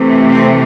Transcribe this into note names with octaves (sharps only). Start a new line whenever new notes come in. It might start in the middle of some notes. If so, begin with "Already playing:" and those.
Already playing: C3 E3 A3
C4